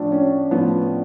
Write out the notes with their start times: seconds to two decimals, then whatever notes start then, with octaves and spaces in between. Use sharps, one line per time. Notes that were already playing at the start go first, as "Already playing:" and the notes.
Already playing: A2 F3 D4
0.12 C#4
0.51 A2 F3 B3